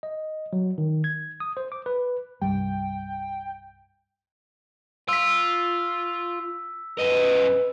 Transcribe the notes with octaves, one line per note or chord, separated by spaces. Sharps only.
D#5
F#3
D#3
G#6
D#6
C5
D6
B4
C2 G2 G3 G5
F4 E6 B6
F#2 B4 D#5